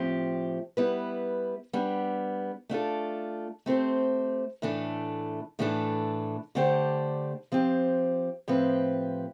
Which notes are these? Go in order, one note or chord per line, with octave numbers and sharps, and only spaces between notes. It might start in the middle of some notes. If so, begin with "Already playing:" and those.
Already playing: A2 F3 C4 G4
G3 B3 E4 B4
G3 B3 D4
A3 D4 F4 A4
A3 C4 G4 C5
A2 E3 A3 D4 A4
A2 E3 A3 D4 A4
D3 A3 D4 G4 C5
F3 C4 G4
A2 F3 C4 G4 B4